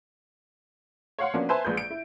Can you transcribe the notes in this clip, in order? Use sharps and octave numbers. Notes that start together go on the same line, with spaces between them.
C#5 F5 F#5 C6
F3 A#3 B3 C#4 D4 F#4
B4 C5 E5 G#5 A5 C6
A#1 G#3 B4 G6
D7
E4